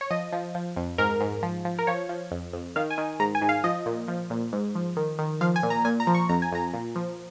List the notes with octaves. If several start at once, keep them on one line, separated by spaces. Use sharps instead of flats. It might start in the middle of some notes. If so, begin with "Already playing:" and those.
C#5
F3 D#5
F3
F3
F2
G#2 A#4
G#2
F3
F3
A#4
F3 C#5
F3
F2
F2
D#3 F5
G#5
D#3
G#2 A#5
G#5
G#2
F5
F3 D#5
A#2
F3
A#2
G#2
F3
D#3
D#3
F3 F5
G#5
A#2
A#5
A#2 G#5
A#5
F3
C#6
F2 A#5
G#5
F2 A#5
A#2
F3